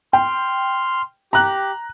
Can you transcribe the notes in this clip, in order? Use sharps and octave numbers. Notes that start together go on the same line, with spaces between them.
G5 C6 F6
G4 A#5 F#6